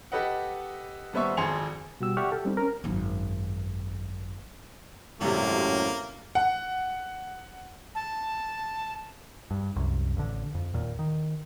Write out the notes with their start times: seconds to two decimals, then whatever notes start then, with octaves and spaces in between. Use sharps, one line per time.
0.12 G4 A4 B4 D#5 F#5
1.13 D#1 G3 B3 C5 E5 C#6
1.37 G#1 F2 G#4 C6 C#7 F7
2.00 B2 G3 F#4 G4 E6
2.17 G4 D5 E5 F#5 C#6 F6
2.32 G4 A4
2.45 G3 C4 D#4
2.57 C#4 A#4
2.84 G#1 F#2
5.21 G#1 F#2 A2 C3 A#3
6.35 F#5
7.95 A5
9.51 G2
9.76 C2 F#2
10.17 A1 D3
10.55 F2
10.74 D#2 A#2
10.99 D#3